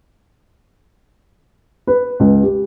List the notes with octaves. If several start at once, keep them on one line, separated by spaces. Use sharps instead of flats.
B4
C#2
G4